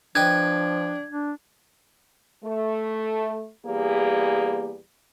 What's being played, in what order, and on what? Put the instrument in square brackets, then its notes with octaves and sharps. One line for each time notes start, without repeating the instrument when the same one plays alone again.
[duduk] F3 [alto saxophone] D4 [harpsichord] B4 D#5 G5 [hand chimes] G#6
[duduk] D4
[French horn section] A3
E2 G3 A#3 G4 G#4